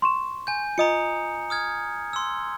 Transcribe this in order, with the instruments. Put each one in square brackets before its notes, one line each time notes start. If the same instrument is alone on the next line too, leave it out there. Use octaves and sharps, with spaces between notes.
[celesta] C6 C#6 E7
[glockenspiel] G#5 G6
[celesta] F4 D#5 [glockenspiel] A#5 D#6 C#7
[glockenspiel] D#6 F6 G#6
C6 E6